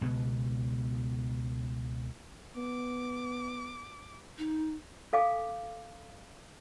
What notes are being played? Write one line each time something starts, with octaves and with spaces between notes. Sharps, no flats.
C#2 B2 B3
B3 D6
D#4
A4 F5 G#5 D6